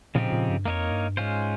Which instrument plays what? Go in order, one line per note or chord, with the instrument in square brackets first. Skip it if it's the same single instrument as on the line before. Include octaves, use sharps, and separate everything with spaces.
[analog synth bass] A#2 [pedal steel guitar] C#3 F3 C4 D#4 G4
[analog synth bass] A#2
G2
[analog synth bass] F2 [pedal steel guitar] A#3 D#4 A#4 C#5
[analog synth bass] G2
[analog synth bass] G#2 [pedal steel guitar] G#3 C#4 F4 C5